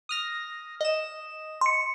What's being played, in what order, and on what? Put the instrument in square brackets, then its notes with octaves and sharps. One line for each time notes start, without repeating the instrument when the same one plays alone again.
[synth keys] D#6 F6 A#6
D#5 E7
[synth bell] C6 C#7